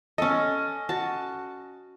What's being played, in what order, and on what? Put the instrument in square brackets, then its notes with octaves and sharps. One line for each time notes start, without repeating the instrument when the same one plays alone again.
[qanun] C#4 A4 [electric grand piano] D#5
[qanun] F#4 A5